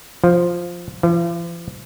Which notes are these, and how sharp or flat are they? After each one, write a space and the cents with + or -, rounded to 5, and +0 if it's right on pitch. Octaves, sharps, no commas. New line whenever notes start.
F3 +0
F3 -45